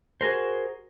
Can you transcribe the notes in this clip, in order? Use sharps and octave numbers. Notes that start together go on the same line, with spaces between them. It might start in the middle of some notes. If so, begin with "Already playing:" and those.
F#4 G#4 A#4 C5